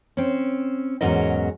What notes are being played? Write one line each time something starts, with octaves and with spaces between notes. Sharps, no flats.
C4 C#4
E2 G#2 F#3 C#4 A#4 D#5